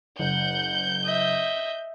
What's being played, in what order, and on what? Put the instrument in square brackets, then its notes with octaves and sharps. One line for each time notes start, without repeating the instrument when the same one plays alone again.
[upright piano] F#1 [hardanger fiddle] F#5 [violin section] G6
[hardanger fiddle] D#5 E5